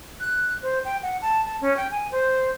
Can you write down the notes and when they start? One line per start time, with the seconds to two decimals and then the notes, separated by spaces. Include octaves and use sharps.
0.20 F#6
0.62 C5
0.85 G5
1.03 F#5
1.22 A5
1.45 A5
1.61 C#4
1.77 G5
1.91 G#5
2.12 C5